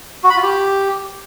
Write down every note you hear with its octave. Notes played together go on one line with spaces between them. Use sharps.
F#4
B5
F4
G4